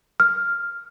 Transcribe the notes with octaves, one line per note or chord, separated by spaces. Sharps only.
F6